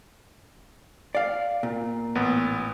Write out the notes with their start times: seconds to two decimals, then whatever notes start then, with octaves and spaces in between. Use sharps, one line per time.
1.15 D5 F5
1.63 A#2
2.15 A1 B3